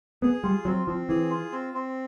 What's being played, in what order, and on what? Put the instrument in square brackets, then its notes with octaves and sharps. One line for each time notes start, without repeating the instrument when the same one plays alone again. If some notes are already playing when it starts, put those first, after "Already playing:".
[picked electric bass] B3 [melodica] G#4
[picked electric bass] G3 [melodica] F4
[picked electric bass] F#3 [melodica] C4
[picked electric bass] F3 [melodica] C4
[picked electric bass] E3 [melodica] G#4
[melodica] F4
C4
C4